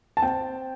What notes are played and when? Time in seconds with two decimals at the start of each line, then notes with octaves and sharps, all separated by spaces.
0.17 A5
0.22 C4 G5